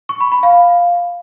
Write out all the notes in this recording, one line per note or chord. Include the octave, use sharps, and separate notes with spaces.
C#6
B5
B5
F5